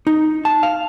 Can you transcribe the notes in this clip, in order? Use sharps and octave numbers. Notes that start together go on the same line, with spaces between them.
D#4
A5
F5